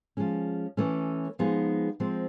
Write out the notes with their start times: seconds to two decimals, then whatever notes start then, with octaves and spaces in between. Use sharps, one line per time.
0.17 F3 G#3 C#4
0.77 E3 A3 C#4
1.39 F3 G#3 B3 D#4 G#4
2.00 F3 G#3 C4